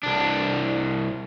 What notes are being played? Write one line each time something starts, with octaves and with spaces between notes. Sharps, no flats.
C2 D4